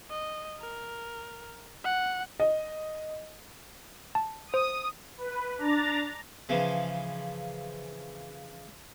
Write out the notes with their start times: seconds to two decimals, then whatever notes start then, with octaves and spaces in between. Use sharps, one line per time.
0.10 D#5
0.60 A#4
1.84 F#5
2.40 D#5
4.15 A5
4.54 C5 D#6
5.18 B4
5.58 D4 A#5 A6
6.49 C#3 E3 F3